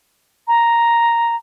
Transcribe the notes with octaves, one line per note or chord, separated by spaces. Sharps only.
A#5